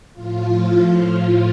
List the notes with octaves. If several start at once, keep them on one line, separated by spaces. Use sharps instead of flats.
A2 F3 F4
F4